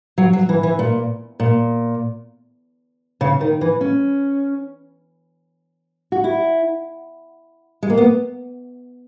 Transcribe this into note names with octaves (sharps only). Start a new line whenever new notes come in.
F#3
F#3
E3
E3
A#2
A#2
C#3
D#3
E3
C#4
F#4
E4
G#3
A#3
B3